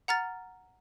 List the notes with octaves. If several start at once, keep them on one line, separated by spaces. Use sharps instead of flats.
F#5 A#5 F6 A6